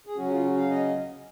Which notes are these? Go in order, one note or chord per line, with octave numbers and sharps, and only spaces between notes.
G#4
C#3 F#3 C#4 F#4
F4
F#4
F5
D#5